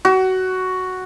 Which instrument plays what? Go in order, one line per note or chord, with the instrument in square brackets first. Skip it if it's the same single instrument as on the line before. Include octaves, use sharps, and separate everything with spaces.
[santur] F#4